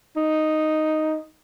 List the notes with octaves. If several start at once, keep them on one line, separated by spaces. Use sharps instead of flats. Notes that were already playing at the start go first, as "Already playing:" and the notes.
D#4